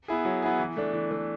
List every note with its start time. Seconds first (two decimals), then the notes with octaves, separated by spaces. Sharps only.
0.08 B3 E4 G#4
0.25 F#3
0.42 B3 E4 G#4
0.59 E3
0.77 A3 D4
0.93 E3
1.11 A3 D4